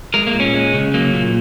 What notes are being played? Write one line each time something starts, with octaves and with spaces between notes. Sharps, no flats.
G#3 A#4
A#3
A#2
C#4
G#3
C#3
F#3 A#3
A#2